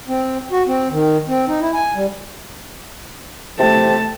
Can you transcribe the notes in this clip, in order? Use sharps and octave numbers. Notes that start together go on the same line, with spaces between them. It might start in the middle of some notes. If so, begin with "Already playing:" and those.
C4
F#4
C4
D#3
C4
D#4
E4
G#5
G3
C3 A3 A5